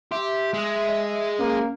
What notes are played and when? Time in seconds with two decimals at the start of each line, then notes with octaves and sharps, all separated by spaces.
0.11 G4 E5 C6
0.54 G#3
0.89 D#5
1.39 A#3 C#4